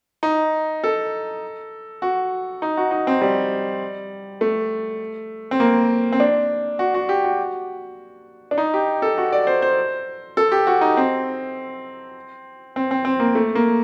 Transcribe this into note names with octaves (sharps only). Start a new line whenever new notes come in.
D#4
A4
F#4
D#4
F#4
D#4
C4
G3
A3
C4
A#3
C4
D4
F#4
F#4
G4
F#4
D4
D#4
G4
A4
F#4
D5
C5
C5
A4
G4
F#4
D#4
C4
C4
C4
C4
A#3
A3
A#3